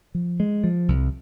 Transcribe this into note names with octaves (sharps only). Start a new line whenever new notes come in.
F3
G#3
F3
C2